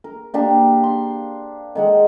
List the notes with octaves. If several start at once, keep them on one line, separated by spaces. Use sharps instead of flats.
A#4
A#3 D4 G4 C5
C6
D#3 G#3 F#5